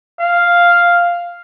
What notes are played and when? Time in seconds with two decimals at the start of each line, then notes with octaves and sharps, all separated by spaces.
0.20 F5